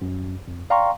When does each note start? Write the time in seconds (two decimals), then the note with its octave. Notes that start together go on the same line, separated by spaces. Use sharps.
0.02 F#2
0.48 F2
0.70 D5 F5 G5 A#5 C6 C#6